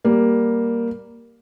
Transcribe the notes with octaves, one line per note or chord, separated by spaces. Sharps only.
G3 A#3